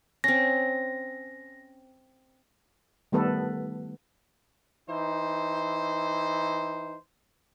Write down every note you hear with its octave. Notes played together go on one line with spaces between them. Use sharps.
C4 C#4 A#6
D#3 G3 A3 B3 A4 B4
E3 D#4 C5